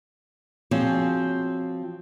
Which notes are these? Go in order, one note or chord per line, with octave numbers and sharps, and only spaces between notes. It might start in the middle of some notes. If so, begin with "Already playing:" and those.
F3 C4 F#4 G#4 C#5